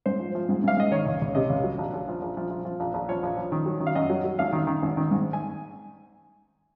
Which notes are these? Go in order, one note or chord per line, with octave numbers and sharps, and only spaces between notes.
G#2 C5
F3
F3
G#2
G#2 F5
G#2 D#5
D#3 C#5
C#2
C#2
C3 D#5
C#2
F#3
A#1
A#1
F3
A#1
F3
F3
F3
A#1
A#1
F3 C#5
A#1
F3
D#3
F#3
D#3
F5
F#2 D#5
F#3
F#3
G#1 F5
D#3
D#3
G#1
D#3
G#2
G#5